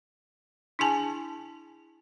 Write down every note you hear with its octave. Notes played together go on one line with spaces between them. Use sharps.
D4 E4 G#4 G#5 A5